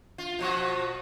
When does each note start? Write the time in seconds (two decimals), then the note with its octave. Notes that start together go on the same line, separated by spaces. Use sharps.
0.18 F4
0.39 B2 F3 F#4